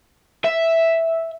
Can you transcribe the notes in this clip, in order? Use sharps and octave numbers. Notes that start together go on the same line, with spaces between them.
E5